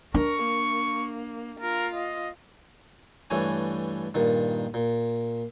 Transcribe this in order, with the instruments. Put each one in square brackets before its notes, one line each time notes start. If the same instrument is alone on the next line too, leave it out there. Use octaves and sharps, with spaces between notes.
[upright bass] D4 [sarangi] A#4 [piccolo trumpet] C#6
[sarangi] A#3
[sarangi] F4 [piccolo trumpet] A#4
[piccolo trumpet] D#5
[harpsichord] G2 E3 A3 C#5 G#5
G2 A#2 D#3
A#2